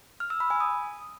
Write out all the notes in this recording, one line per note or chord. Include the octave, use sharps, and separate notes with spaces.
F6
E6
B5
G#5
D#6